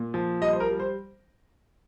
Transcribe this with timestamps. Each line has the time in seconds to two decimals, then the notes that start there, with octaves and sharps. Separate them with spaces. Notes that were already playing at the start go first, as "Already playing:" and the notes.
Already playing: A#2
0.14 F3
0.41 G3 D#5
0.53 C5
0.60 A#4
0.70 G3
0.80 C5